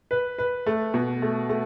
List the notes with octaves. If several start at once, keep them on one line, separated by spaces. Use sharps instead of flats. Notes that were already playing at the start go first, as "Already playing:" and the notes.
B4
B4
A3
B2
A3
A3